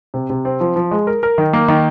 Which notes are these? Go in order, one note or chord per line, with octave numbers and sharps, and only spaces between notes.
C3
C3
C4
F3
F3
G#3
A#4
A#4
D#3
A#3
D#3